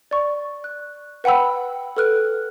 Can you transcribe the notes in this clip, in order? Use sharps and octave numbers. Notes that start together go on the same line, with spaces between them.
D5 C#6
F#6
B4 F#5 G5 B5 E6
A4 B4 F6 F#6